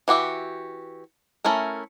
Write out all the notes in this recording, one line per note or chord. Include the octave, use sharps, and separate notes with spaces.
E3 F#4 G4 E5
A3 C#4 E4 A#4